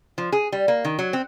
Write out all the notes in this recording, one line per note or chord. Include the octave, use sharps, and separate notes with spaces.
F3
G#4
G3
A#3
D#3
F#3
C4